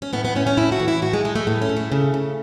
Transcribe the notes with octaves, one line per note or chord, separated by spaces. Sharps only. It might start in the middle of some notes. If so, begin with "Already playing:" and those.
C#4
A2 B3
B3
A2 C#4
C#4
A2 E4
F#4
E3
E4
A2 F#4
G#3
A2 G#3
A3
A2 B3
C#4
A2
A3
C#3
C#3